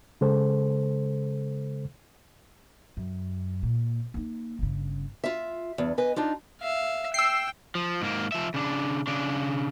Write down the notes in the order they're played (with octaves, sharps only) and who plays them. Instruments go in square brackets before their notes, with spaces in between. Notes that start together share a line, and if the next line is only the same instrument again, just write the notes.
[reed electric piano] C#3 G#3 A4 C5
[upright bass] F#2
A#2
A#3 D#4
G1 C#3
[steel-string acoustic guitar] F4 E5
E2 G2
B4 D#5 G#5
D4 D#4 F4
[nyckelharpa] E5 F5
[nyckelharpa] G5 [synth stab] E6 C7
[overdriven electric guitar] F3
G#2 A#3
F3 E5
C#3 D4
C#3 D4